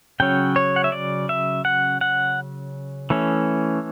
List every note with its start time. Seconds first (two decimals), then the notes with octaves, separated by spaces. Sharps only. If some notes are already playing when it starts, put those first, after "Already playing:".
0.20 C#3 F#3 C#4 G5
0.56 C#5
0.76 F#5
0.84 E5
0.92 D5
1.29 E5
1.65 F#5
2.01 F#5
3.10 E3 A3 C#4